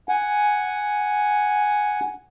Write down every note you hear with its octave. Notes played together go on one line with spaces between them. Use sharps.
F#5 G#5